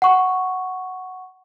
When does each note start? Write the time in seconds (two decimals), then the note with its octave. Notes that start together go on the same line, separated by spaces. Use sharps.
0.02 F#5 C#6